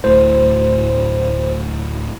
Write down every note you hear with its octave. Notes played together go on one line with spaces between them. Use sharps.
D1 A2 C5